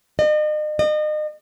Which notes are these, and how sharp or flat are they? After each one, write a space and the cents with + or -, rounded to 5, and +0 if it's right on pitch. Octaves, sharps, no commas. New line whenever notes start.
D#5 -40
D#5 -35